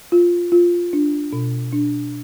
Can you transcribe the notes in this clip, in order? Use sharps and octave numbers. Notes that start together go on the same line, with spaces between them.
F4
F4
D4
B2
D4